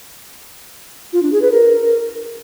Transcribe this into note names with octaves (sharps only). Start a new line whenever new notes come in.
F4
D4
G#4
B4
A#4